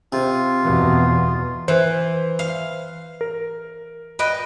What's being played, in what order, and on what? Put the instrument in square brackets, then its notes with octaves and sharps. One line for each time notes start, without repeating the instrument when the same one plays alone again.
[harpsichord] C3 [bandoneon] F4
[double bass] E2 B2
[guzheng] E3 [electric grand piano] B4 C5
[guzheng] F5
[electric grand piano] A#4
[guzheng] B4 D#5 G5